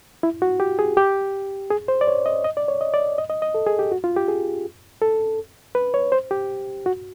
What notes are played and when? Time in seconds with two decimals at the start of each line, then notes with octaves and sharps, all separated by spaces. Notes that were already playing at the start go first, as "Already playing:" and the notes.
0.23 E4
0.42 F#4
0.60 G4
0.79 G#4
0.97 G4
1.71 G#4
1.88 C5
2.01 D5
2.08 C#5
2.26 D#5
2.44 D#5
2.57 D5
2.68 C#5
2.81 D#5
2.94 D5
3.18 D#5
3.30 D#5
3.42 D#5
3.54 A4
3.66 G#4
3.79 G4
3.92 F#4
4.04 F4
4.16 G4
4.28 G#4
5.02 A4
5.75 B4
5.94 C#5
6.12 C5
6.31 G4
6.86 F#4